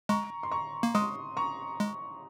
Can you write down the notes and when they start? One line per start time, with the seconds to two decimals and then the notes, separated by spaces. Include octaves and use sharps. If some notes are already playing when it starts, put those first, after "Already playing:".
0.09 G#3 A#5 C#6
0.43 C6
0.51 A#5 C#6
0.83 A#3
0.95 G#3 C6 D#6
1.37 A#5 C#6
1.80 G#3